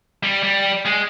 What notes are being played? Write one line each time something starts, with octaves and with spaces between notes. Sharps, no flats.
G3
G3
G#3